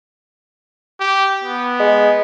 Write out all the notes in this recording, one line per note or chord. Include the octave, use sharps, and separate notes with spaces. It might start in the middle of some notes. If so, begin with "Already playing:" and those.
G4
B3
G#3